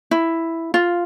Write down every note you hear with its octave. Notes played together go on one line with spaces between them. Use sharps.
E4
F4